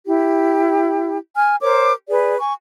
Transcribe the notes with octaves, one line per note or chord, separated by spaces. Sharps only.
E4 G4
G#5 F6
A#4 C5 C#5 D6
G#4 B4 D5
G#5 C#6